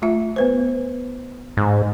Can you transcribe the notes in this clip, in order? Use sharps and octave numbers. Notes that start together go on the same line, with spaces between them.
A3 F4 E5
B3 B4 C5
G#2